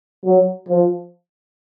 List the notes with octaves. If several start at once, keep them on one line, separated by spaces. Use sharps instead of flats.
F#3
F3